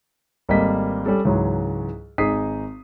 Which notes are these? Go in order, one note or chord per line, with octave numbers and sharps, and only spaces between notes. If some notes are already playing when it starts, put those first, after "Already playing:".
G#1 G3 A#3 A4 D#5 B6
G3 C#4 A4
C#2 G#2 E3 F#3
G#1 D#4 G#4 D#6 B6 C7